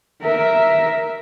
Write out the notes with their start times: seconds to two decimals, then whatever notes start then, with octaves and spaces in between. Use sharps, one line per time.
0.22 A#4 E5